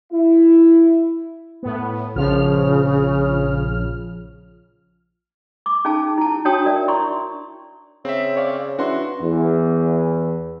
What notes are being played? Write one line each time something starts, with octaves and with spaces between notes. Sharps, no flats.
E4
A2 B3
A#1 C#3 F3 F6
D6
C#4 D#4 G#4 F5 A5
E4 A5
D4 F#4 C#5 G5 A5 D#6
A#4 D5 E5
E4 C6 C#6
C#3 C4 E5
C#5 D5 F5
E3 C#4 D4 F#4 E5 C6
E2